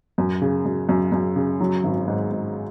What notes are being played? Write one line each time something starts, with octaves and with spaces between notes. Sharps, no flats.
F#2
C#3
F#2
F#2
F#2
C#3
F#3
G#1
G#2
G#2